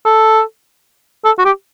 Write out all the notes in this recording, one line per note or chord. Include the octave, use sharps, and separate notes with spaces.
A4
A4
F#4
G4